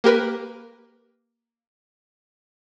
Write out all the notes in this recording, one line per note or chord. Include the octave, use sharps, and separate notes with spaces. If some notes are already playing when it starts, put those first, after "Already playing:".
A#3 G4 A#4 B4